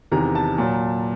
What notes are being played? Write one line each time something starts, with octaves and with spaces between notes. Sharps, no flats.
E2 C3 D#3 A#5
A5
A#2 F#3